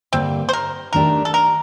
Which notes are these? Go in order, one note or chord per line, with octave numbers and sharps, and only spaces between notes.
G2 D3 G3 A#3 C4
C5
A#4
D#3 A3 D4 G4 A#4
A4
A#4